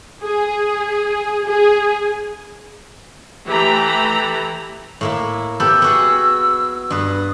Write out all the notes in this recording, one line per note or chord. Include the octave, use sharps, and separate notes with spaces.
G#4
G#4
E3 A3 G4 A4 A#5 B5
A2 A#3 E4
B3 G4 A4 E6
B3 F#4 G#4
G2 B4 D#6